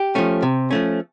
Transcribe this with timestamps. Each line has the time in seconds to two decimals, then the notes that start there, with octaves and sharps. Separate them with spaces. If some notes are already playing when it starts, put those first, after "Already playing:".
Already playing: G4
0.15 F3 A3 C#4
0.43 C3
0.71 F3 A3 C#4